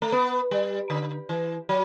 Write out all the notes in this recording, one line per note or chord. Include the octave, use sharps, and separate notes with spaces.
A3
B3
G3
D3
E3
F#3